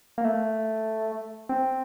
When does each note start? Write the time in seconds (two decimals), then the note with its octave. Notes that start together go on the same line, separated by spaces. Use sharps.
0.18 A#3
0.25 A3
1.49 C4